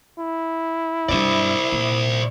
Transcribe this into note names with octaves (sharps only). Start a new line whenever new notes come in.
E4
G2 G3 C5 D5
A#2